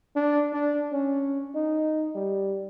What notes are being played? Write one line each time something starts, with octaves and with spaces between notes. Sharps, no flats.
D4
D4
C#4
D#4
G3